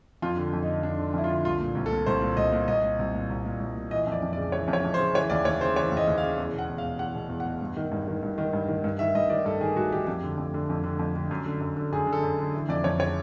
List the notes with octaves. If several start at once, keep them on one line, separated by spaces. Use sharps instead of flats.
F2 F4
D3
F2
D#4
D3
F2 D4
D3
F2 E4
F4
D3
C2 F4
A#2
C2
A4
A#2
C2 C5
A#2
C2 D#5
A#2
C2 D#5
A#2
C2
A#2
C2
A#2
C2
A#2
E3 D#5
F2
D5
F2
D5
C#3
E3 C#5
F2
C#5
F2
C5
C#3
E3 C#5
D#2 D5
D#2 C#5
C#3 C5
E3 C#5
D#2
D#5
D#2
F5
C#3
E2
B2
F#5
E2
F5
B2
E2 F#5
B2
E2
F#5
B2
G2
D#3
G2
D#3
G2
D#3
G2
D#3
G2
D#3 E5
G2 D#5
D#3 D5
G2 A4
D#3 G#4
G2 F#4
D#3 G4
F2 G4
D3
F2
D3
F2
D3
F2
D3
F#2
D3
F#2
D3
F#2 G#4
D3
A4
F#2
D3
E3
F2 D5
F2 C#5
C#3 C#5